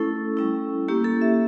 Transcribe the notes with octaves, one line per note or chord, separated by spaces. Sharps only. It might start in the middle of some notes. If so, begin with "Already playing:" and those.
Already playing: A3 C#4 E4 A4
G3 C#4 E4
A#3 C#4 E4 G4
A4
E5